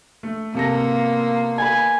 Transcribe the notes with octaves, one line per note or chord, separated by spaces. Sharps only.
A3
C3 A#3 B3 F4 A4 A#6
B4 G#5